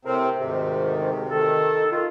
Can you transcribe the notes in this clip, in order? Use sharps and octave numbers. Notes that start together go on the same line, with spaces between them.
A2 C3 C4 A#4 C5
D2 G#2 C3 D#3
D#3 A4
D#3 F4